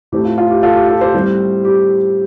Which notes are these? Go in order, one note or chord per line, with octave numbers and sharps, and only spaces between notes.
A2 A3 C4 G4
F4
F4
G4
F4 A4
G4
F4 A4
G4 C5
A2 G3 C4
G4